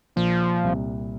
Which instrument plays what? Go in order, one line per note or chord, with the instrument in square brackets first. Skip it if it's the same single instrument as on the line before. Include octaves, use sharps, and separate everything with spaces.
[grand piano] A#2 [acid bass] F3
[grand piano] C2